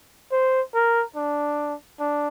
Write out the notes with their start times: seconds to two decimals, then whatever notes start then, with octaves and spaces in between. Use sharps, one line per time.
0.32 C5
0.75 A#4
1.16 D4
2.00 D4